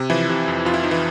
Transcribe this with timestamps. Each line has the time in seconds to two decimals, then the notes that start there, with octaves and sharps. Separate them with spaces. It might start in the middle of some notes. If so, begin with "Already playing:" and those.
Already playing: C3
0.10 E3 F3 E4
0.29 C3
0.48 F2
0.65 F2 F4
0.74 E4
0.83 F3 D#4
0.91 E3 E4